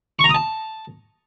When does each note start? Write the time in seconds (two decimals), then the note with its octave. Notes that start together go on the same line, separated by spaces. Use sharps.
0.19 C#6
0.24 A#5
0.29 D#6
0.35 A5